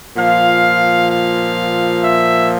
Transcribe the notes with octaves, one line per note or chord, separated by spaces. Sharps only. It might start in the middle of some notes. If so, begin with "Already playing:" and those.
A#2 F3 F5
F5
E5